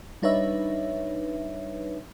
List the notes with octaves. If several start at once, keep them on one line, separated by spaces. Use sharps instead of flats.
G3 D4 D#4 B4 C#5 E5